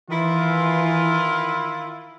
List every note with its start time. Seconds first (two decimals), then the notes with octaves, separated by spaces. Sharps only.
0.10 D#3 E3 E4 F4